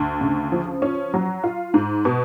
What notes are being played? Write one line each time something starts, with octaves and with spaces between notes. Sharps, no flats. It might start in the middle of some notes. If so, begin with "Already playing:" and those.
Already playing: D2
C#3
F3
C#4
F#3
F4
G#2
B2